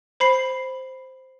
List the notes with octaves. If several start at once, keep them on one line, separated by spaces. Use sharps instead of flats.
C5 B5 C7